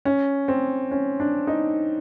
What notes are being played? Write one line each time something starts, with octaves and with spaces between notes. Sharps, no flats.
C#4
C4
C#4
D4
D#4